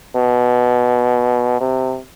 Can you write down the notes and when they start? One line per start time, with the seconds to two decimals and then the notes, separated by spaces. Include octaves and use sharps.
0.16 B2
1.60 C3